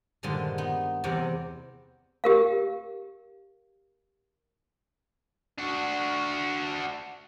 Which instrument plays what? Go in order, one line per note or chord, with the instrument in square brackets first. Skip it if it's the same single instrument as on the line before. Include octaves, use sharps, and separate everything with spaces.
[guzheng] G2 A#2 D3 D#3 F3 G#3
B3 D#4
E2 C3 C4 D5 F#5 A#5
[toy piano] G4 A#4 F5
[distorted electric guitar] D4 F#4